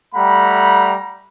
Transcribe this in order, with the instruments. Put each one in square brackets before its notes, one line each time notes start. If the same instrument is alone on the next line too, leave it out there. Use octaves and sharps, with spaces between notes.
[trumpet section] G3 A3 F#5 G5 A#5 B5